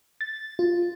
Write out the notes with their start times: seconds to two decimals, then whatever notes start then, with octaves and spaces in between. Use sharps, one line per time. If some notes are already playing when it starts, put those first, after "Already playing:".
0.21 A6
0.59 F4